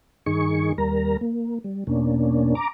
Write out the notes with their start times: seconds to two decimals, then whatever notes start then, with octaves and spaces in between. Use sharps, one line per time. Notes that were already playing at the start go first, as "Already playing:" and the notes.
0.26 G2 D#3 D#4 G#4 C#6
0.78 D#2 G3 A#4 A#5
1.21 A#3
1.64 G3
1.87 E2 B2 A#3 C#4 D4
2.55 A#5 D6